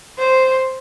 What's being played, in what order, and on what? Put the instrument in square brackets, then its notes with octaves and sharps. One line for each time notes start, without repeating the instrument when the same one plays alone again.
[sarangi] C5